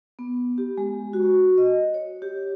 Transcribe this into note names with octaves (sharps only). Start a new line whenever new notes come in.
B3
G4
G#3
F#4
D#5
C#5
G4